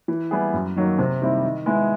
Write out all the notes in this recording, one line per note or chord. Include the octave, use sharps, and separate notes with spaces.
E3
G3 B3 E4 G#4
F#2
D#3 F#3 A#3
C3
D#3 G3 C4 E4
D#3
G#3 B3 E4 G#4